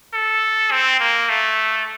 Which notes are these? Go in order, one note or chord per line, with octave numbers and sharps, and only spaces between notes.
A4
C4
A#3
A3